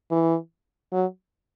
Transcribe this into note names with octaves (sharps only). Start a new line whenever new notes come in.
E3
F#3